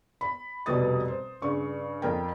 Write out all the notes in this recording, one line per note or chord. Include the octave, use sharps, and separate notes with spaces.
B5
F1 B2 G3 G4 D#6 A6
C5
G2 C#3 C#6
F2 A#4 G5